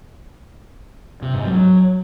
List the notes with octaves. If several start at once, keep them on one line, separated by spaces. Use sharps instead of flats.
C3
G#2
F#3